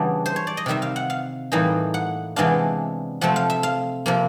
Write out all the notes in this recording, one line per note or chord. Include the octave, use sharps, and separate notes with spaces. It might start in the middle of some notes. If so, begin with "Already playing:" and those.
Already playing: C#3 E3 G3 B3 D4
C5
C#5
D5
D#5
C3 D#3 G3 E5
F5
F#5
F5
A2 E3 G3 A#3 D#4
F#5
C3 E3 G#3 B3 D4 F5
C3 F3 A3 C4 F#5
F5
E5
F5
C3 F3 A#3